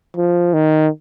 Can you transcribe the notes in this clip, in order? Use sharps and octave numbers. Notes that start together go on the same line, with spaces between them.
F3
D#3